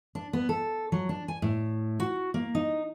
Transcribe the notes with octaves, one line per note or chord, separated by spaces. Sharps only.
D4
B3
A4
F#3
D4
G#5
A2
F#4
A#3
D#4